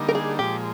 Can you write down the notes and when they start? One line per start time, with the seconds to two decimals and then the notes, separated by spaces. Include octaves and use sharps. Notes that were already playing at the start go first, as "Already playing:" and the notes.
Already playing: D3 G3 A#3 D#4
0.09 A#4
0.15 G#4
0.39 A#2 F3 G#3 G4